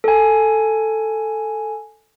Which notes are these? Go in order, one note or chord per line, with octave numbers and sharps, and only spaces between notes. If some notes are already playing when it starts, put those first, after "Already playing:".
A4 G#5